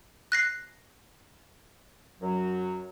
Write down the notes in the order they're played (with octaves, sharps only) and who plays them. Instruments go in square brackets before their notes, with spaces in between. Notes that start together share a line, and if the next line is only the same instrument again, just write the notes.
[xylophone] F#6 A#6 C7
[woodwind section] F#2 F#3